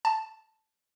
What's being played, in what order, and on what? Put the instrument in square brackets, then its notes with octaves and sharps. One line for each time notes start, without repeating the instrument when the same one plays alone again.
[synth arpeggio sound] A5